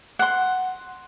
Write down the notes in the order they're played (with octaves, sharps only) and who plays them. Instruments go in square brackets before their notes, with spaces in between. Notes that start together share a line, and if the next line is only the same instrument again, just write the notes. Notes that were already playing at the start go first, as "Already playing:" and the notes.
[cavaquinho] F#5 C6